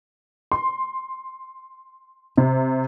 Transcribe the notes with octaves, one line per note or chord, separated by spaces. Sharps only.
C6
C3